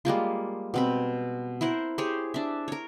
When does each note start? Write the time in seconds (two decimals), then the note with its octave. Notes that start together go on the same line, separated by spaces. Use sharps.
0.05 G3 G#3 A#3 F4
0.74 B2 C4 B5
1.61 E4 A#4 C5 F#5
1.98 G4 G#4 C5 C#5
2.34 D4 E5
2.68 A#4 C#5